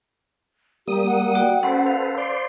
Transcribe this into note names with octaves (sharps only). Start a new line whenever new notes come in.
G3 A#3 G4 D#6
F#5
F#4 D5 G5
C#4 A4 B4 C5
F5
C5 D5 C6